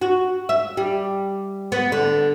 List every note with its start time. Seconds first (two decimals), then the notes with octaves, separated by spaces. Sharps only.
0.02 F#4
0.49 E5
0.77 G3
1.72 B3
1.92 D3